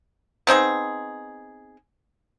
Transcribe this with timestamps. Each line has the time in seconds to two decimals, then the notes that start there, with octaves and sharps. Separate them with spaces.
0.47 B3 C4 D#4 G#4